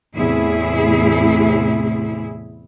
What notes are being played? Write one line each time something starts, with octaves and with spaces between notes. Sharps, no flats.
E2 A2 C3 E4 G#4